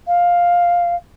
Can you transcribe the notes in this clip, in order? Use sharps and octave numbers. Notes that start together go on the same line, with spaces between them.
F5